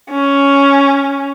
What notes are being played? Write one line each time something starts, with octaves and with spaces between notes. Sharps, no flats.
C#4